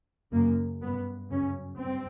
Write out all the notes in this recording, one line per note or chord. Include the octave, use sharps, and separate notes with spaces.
F#2 C#3 A#3
G2 B3
F#2 C#3 C#4
G2 C4